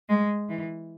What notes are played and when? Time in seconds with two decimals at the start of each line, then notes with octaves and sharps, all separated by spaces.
0.09 G#3
0.49 E3